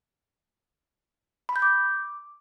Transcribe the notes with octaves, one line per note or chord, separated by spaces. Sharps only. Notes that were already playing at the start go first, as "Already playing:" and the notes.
B5
G6
D6